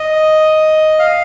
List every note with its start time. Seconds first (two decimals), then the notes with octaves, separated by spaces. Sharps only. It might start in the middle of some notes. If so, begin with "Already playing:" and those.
Already playing: D#5
0.99 F5